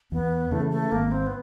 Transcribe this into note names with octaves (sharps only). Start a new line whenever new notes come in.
E2 B3
C#3 E3 A3
A3
G#1 A#3
C4
B3